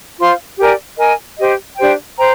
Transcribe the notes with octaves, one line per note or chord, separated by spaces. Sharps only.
F4 C5 F5 C6
G4 A#4 D5 G#5
A#4 D#5 G#5
G4 C5 D#5
D4 G4 C5 G5
C5 G5 A#5